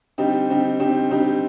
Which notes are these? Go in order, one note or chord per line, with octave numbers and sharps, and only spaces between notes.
D3 G3 C4 D#4 G4
D3 G3 C4 D#4 G4
D3 G3 C4 D#4 G4
D3 G3 C4 D#4 G4